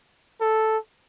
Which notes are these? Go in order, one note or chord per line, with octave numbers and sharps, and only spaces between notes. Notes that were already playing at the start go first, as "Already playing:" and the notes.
A4